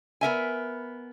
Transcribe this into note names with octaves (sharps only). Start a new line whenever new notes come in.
B3 A#4 E5 G#5